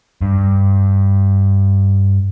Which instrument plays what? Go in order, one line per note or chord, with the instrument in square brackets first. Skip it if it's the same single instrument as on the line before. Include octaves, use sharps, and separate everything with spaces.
[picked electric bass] G2